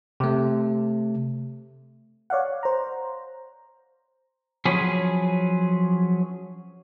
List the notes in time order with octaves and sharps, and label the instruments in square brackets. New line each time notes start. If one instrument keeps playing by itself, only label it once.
[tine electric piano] C3 A3
[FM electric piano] C#5 D5 F5 F#5
C5 A#5
[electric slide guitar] F3 F#3 C#4 G#4 B4